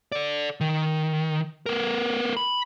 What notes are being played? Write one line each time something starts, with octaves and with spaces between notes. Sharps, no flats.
A4 D5
D#3
B3 A#4
B5